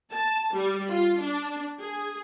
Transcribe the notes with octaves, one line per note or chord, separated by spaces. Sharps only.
A5
G3
F4
D4
G#4